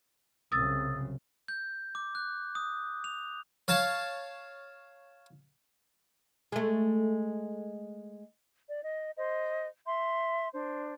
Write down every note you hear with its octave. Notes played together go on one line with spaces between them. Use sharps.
C2 F#2 C#3 D#6 E6 A6
G6
D6
F#6
D#6
F7
C#5 F5 A5
G#3 A3
D5
D#5
C5 D#5
E5 C6
D4 C5